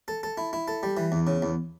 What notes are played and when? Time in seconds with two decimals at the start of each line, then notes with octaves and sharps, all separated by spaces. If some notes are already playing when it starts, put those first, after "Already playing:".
0.08 A4
0.23 A4
0.38 E4
0.53 E4
0.68 A4
0.83 G3
0.97 E3
1.12 E2
1.27 C#3
1.42 E2